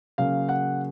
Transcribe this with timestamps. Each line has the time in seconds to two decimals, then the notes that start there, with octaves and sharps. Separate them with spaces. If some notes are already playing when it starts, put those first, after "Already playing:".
0.18 C#3 F#3 A#3 F5
0.49 F#5